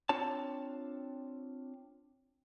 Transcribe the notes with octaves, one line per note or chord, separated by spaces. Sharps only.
C4 D4 F4 C#5 A5